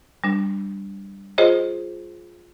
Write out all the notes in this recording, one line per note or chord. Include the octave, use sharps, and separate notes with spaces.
G3 D4
F4 G#4 C5 C#5 D#5